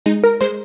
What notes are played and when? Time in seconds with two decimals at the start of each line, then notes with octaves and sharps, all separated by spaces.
0.06 G#3 D#4
0.24 A#4
0.41 G#3 C5